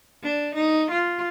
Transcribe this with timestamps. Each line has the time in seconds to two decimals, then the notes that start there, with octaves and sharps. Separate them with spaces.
0.23 D4
0.55 D#4
0.91 F4